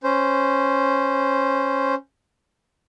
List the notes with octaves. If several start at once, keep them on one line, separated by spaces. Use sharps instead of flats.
C#4 C5